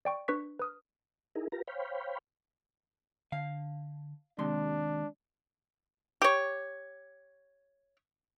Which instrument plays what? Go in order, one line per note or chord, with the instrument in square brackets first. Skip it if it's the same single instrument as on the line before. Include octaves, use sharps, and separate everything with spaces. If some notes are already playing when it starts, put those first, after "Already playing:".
[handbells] D5 G5 C#6
D4 B4 C#6 B6
B4 D#6 F6
[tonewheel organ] D#4 E4 G#4 A#4
F4 G4 A#4 B4 A#5
C5 C#5 F5 G5 B5
[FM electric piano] D3 [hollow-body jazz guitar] F5
[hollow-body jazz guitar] D#2 C3 C6 [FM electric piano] G#3 [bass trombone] D4
[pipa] G4 C#5